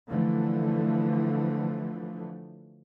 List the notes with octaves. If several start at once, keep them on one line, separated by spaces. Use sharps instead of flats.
D3 E3 F3 A3